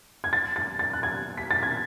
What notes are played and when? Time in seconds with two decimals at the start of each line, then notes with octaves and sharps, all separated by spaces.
0.24 G#6
0.33 A6
0.56 A6
0.79 A6
0.93 F#6
1.03 G#6
1.37 B6
1.51 A6
1.63 G#6